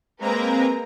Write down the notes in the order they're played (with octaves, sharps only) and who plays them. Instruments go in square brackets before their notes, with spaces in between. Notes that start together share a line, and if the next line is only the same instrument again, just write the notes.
[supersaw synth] G#3 C4 A#5 [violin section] A#3 A#4 B4